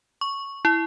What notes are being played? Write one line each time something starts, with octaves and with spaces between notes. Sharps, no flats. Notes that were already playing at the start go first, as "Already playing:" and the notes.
C#6
E4